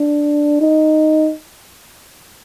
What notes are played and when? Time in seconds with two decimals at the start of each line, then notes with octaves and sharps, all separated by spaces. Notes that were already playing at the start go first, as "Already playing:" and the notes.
Already playing: D4
0.61 D#4